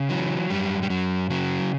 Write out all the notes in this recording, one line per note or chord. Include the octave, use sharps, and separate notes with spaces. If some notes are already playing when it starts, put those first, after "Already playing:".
Already playing: C#3
E3 F#3
F#2 G3
G3
F#2 F#3
C#3 F#3